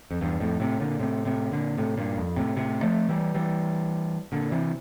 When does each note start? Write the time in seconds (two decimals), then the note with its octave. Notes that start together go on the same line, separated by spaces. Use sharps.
0.11 F2
0.21 E2 G2
0.40 F2 A2
0.60 A2 C3
0.80 A#2 D3
1.00 A2 C3
1.25 A2 C3
1.51 A#2 D3
1.78 A2 C3
1.97 G2 A#2
2.17 F2
2.36 A2 C3
2.56 A2 C3
2.82 F3 A3
3.09 E3 G3
3.34 E3 G3
4.32 A#2 D3
4.51 C3 E3